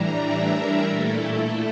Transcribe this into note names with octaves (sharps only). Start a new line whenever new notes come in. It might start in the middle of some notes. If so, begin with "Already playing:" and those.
Already playing: A2 E3 G3 D4 A#5
E5
A#4
A#2 A3 E4 A4